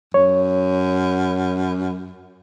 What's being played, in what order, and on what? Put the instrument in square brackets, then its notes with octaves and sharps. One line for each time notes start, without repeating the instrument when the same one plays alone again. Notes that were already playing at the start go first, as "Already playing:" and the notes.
[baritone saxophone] F#2 [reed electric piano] C#5